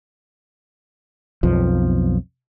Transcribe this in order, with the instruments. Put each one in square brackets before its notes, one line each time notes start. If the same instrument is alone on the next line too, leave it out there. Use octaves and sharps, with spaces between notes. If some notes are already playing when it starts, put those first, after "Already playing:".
[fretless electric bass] B1 F2 F3